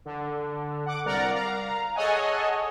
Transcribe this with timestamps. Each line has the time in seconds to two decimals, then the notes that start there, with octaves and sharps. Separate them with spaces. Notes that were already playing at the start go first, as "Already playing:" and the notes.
0.05 D3
0.86 F#5 D6
1.05 C2 A#4 D5 F#5 A#5
1.32 F5 A#5
1.95 G#4 A4 C#5 D#5 F#5 G#5